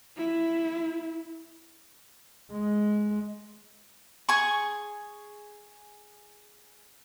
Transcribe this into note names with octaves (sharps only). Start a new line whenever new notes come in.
E4
G#3
G#4 C#6